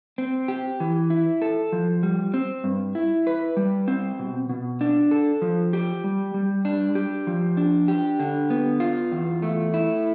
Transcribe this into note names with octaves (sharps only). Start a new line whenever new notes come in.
C4
G4
E3
E4
A4
F3
G3
C4
G2
E4
B4
G3
C4
B2
B2
D4
A4
F3
G4
G3
G3
D4
G4
F3
D4
G4
D3
B3
F4
E2
A3
E4